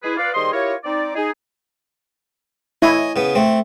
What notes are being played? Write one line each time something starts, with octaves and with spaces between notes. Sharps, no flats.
G#3 E4 G#4 B4
F4 B4 D5 F5
D#3 G3 G#4 C5 D#5 C6
E4 F4 G4 A#4 C#5
C4 D#4 D5
D#4 G#4
E4 C#5 D#5 G#5
C#3 B3
A3 C4